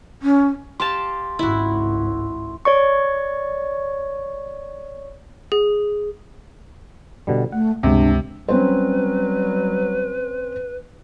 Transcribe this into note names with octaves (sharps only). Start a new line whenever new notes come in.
C#4
G4 F5 A5 C6
G#1 C#2 E4 F#4
C#5 D5 C#6
G#4
B2 D3 G3
A3 F#5
G1 C#2 C3 G#3 D4
F#3 G3 C4 C#4 B4 C5